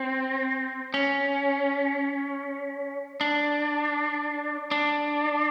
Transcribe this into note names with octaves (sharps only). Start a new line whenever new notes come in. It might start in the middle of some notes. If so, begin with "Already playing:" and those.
Already playing: C4
C#4
D4
D4